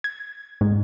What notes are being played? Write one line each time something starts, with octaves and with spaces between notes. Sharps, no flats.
G#6
G#2